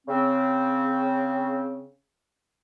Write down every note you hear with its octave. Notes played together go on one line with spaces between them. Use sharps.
C#3 C4